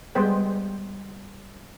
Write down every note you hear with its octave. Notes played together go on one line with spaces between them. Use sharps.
G3 G#3 B3 B4 C5 G5